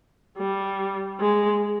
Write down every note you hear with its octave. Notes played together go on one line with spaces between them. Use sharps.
G3
G#3